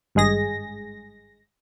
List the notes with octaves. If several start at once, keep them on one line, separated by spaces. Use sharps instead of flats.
G#1 G2 G#3 G#4 A#6